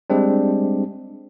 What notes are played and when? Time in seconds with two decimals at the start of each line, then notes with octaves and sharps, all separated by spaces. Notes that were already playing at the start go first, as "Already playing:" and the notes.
0.10 G3 G#3 C4 D4